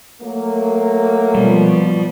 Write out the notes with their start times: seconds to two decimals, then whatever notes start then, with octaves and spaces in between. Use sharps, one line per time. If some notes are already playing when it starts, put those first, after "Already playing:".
0.22 F#3 A3 A#3
1.35 B2 F3 G3